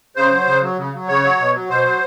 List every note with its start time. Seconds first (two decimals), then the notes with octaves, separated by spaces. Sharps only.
0.16 C#3 C5
0.32 F#3
0.47 C#3
0.62 F#3
0.78 C#3
0.93 F#3
1.08 C#3 C#5
1.24 F#3
1.39 B2
1.54 F#3
1.69 B2 C5
1.85 F#3